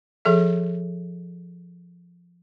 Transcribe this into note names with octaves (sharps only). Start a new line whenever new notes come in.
F3 G#4 A4 E5